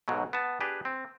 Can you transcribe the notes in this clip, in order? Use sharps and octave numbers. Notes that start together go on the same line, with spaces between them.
B1 G#2 B2 F#3
B3 A5
D4 G4 G#4 B4
C4